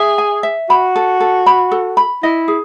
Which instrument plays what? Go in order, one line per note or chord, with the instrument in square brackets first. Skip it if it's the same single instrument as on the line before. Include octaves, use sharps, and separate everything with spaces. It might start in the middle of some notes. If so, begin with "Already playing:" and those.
Already playing: [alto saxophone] G#4 [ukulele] E5
[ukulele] G#5
E5
[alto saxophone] F#4 [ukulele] B5
[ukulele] A4
A4
B5
A4
B5
[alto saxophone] E4 [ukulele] D#5
[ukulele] G#4